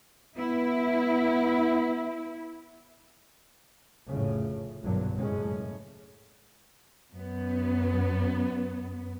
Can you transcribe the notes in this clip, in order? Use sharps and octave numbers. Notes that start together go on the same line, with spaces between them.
B3 E4
F1 A2 C#3
B1 E2 G2 A#2 D3 F#3
F#1 A2 G#3 C#4
F#2 B3